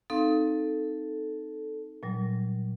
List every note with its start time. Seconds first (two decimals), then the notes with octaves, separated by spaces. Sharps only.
0.10 C4 D#4 A4 F5
2.03 A#2 F#3 G3